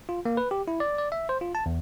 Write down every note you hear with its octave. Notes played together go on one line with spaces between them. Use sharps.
F4
A#3
B4
G4
E4
D5
D5
E5
C5
F4
A5
E2